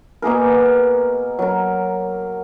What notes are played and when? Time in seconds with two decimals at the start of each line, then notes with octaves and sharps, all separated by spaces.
0.22 B2 A#3 G#4 A#4
1.39 F#3 A#4